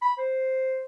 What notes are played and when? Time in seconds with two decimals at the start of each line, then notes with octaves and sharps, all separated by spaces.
0.02 B5
0.18 C5